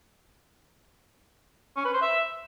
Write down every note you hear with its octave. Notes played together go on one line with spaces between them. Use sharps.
C#4
B4
C5
E5